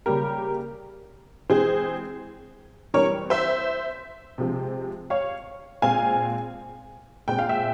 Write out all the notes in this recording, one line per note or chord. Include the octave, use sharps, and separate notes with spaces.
C#3 G3 A#3 G4 A#4
E3 G#3 C4 G#4 C5
E3 G3 C4 A#4 C#5
C5 E5
C3 F3 G#3 C4
C#5 F5
A#2 G#3 C4 F5 G#5
A#2 G#3 C4 G5
F5
E5 G5